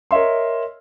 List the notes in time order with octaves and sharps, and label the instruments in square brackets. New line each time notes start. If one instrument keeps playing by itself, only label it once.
[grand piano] A#4 C#5 D#5 E5 C6